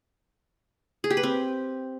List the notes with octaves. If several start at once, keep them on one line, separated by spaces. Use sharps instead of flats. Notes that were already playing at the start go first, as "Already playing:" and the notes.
G#4
G4
B4
C4